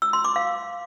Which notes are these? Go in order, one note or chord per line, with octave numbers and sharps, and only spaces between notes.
E6
C6
D6
F5